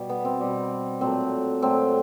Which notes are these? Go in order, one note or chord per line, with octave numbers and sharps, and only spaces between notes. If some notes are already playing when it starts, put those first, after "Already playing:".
Already playing: B2 G3
B3
C4
B2 G3
A#2 F#3 A3 C4
A#2 F#3 A3 C4